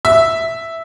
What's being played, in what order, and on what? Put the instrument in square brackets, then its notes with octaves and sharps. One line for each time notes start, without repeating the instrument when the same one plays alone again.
[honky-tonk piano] E5